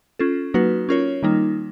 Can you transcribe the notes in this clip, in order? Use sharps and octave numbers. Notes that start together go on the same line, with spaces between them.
C#4 F4 A4
F#3 A#3 D#4 F#4 B4
C#4 F4 A#4 C#5
D#3 G3 A#3 D#4